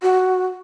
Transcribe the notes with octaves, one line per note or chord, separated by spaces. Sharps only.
F#4